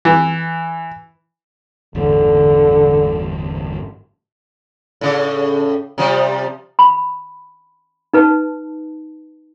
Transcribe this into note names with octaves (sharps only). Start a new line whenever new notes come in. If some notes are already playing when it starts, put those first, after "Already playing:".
E3
G1 E2 A2 D3
A2 C#3
C3 F3 G3
B5
D#4 B4 A5